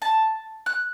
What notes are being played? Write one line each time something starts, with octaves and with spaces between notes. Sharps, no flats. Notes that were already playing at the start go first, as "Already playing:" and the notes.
A5
F#6